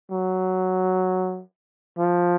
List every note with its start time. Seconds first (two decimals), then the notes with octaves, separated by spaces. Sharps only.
0.11 F#3
1.98 F3